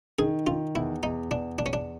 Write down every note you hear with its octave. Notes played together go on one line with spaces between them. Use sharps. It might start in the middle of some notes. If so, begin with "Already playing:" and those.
D#3 G#4
D#3 F4
E2 E4
E2 D#4
E2 D4
E2 D4
C#4
D4